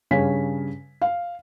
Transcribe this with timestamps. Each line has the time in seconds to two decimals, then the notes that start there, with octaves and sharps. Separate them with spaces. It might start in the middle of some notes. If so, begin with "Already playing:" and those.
0.11 G2 C#3 C#5 F5 G#5 B6
1.02 F5